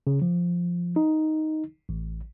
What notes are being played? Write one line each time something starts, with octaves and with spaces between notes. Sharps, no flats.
C#3
F3
D#4
A1